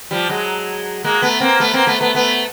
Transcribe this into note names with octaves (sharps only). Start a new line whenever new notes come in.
F3 G3
F#3 G#3
G#3 A#3
A3 B3
A#3 C4
A3 B3
A#3 C4
A3 B3
A3 B3
A3 B3